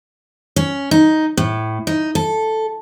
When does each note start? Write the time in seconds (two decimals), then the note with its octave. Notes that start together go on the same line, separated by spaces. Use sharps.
0.56 C#4
0.91 D#4
1.37 A2
1.87 D#4
2.15 A4